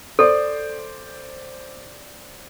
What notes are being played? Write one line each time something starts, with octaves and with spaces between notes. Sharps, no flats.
A4 C5 D5